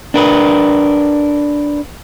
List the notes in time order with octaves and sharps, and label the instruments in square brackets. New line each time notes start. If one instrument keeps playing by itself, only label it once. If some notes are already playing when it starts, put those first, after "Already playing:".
[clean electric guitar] D4 A#4 B4